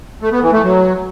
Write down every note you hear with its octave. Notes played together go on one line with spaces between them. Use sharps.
A3
B3
E3
A3
F#3